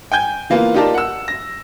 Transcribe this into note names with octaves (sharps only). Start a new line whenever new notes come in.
G5 G#5 G6 G#6
E3 A#3 B3 F4
D#4 F4 G4 A#4 D5 A5
F#5 E6
A#6